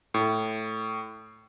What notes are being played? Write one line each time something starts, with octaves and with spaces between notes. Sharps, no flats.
A2